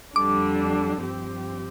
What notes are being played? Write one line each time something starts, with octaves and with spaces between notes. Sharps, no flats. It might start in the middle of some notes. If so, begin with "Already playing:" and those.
F2 D3 G3 D4 D6
G2 F3 C4 G4